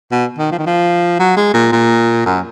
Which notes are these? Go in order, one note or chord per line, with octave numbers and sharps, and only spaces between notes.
B2
D#3
F3
D#3
F3
F#3
G#3
A#2
A#2
F#2